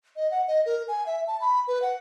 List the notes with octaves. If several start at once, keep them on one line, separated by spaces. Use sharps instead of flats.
D#5
F#5
D#5
A#4
G#5
E5
A5
B5
B4
F#5